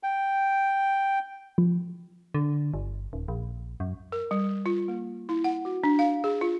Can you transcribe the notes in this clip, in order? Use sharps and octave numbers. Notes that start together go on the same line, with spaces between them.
G5
F3
D3
G1
D#1
A#1
F#2
A#4
G3
F4
A#3
E4
F#5
F#4
D4
F5
G#4
F4